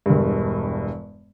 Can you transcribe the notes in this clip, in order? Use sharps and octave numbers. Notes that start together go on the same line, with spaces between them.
E1 G2